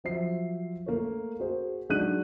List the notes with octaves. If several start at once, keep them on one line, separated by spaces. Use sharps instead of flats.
F3 F#3 C5 E5 C7
A3 A#3 A4 C#5
F#4 G#4 C5
F#3 G#3 D4 D#4 F#6 D#7